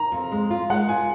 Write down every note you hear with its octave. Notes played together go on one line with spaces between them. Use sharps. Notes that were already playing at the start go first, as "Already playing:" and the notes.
Already playing: A#5
F2
G#3
F4
G#3 F#5
F4 G#5